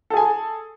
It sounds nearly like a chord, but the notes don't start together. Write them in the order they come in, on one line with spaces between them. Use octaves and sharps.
A4 G#4 G#5